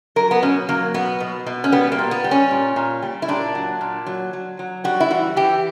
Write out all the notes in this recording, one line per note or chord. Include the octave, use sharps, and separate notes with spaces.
F#3 A#4
B3
B2 C#4
F#3 A#3
B2 B3
B2
B2
C#4
G3 B3
A#3
A#2
B3
G3
C#4
A#2
A#2
G3
E4
A#2 D4
F#3
A#2
F#3
F#3
F#3
G3 F#4
E4
E3 F#4
E3 G4